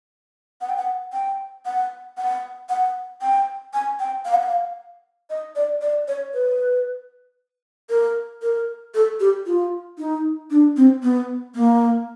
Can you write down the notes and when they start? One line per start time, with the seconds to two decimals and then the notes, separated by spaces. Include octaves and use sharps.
0.61 F#5
0.69 G5
0.77 F#5
1.13 G5
1.66 F#5
2.17 F#5
2.69 F#5
3.21 G5
3.74 G#5
3.99 G5
4.25 F5
4.34 F#5
4.43 F5
5.30 D#5
5.56 D5
5.81 D5
6.08 C#5
6.34 B4
7.90 A#4
8.42 A#4
8.94 A4
9.20 G4
9.46 F4
9.99 D#4
10.51 D4
10.77 C4
11.03 B3
11.55 A#3